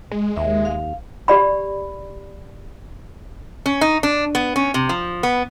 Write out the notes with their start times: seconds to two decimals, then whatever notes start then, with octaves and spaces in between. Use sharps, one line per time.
0.12 G#3
0.37 D#2 E5
0.65 F5
1.28 G4 D5 B5
3.66 C#4
3.81 D#4
4.03 D4
4.35 B3
4.56 C#4
4.74 C3
4.89 F3
5.23 B3